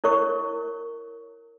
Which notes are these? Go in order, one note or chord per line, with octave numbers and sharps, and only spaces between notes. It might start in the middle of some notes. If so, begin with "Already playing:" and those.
E4 A#4 C#5 C#6